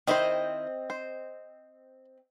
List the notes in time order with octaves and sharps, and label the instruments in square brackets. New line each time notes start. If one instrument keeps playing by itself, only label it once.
[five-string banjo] D#3 E4 C5 [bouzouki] C4 D#5
[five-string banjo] C5